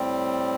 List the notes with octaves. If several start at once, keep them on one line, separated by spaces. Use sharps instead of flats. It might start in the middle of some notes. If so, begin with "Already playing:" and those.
Already playing: A2 G3 C4